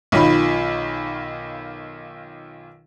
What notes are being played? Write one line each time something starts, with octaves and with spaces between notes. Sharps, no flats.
B1 D#3 F4 B5